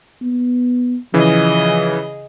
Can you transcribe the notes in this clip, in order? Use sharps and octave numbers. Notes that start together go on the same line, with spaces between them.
B3
C#3 E3 F3 G#4 D#5